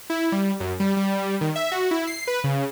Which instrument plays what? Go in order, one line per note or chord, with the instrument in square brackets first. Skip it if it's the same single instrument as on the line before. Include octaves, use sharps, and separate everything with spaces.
[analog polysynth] E4
G3
F#2
G3
G3
D#3
E5
F#4
E4
C7
B4
C#3